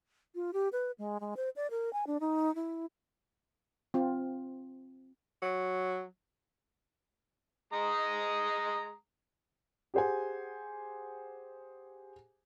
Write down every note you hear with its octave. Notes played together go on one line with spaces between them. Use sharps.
F4
G4
B4
G#3
G#3
C5
D5
A#4
G#5
D4
D#4
E4
C4 F4
F#3
G#3 A#5 D#6
G4 G#4 C5 F#5 G#5